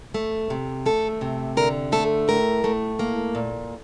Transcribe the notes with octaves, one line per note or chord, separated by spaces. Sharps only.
A3
C3
A3 A4
C3
D3 A#4
A3 A4
A2 A#4
A3
A#3
A#2